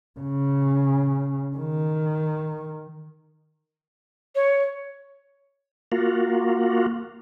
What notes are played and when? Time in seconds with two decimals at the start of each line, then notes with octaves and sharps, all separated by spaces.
0.20 C#3
1.57 D#3
4.35 C#5
5.92 A#3 F4 F#4